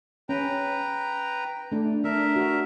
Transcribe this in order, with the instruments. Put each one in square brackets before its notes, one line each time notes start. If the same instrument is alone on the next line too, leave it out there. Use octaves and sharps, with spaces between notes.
[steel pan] C#4 [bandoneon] B4 G5 A#5
[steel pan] A3 D4
[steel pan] D4 [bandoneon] A#4 E5
[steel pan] F#4